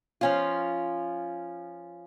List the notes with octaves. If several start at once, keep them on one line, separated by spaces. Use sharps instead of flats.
F3 C#4 F4